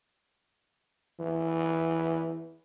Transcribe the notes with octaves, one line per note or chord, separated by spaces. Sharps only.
E3